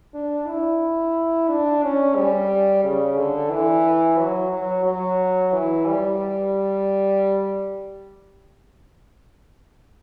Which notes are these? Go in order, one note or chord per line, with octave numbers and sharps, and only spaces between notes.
D4
E4
D4
C#4
G3
C#3
D3
E3
F#3
F#3
F#3
E3
G3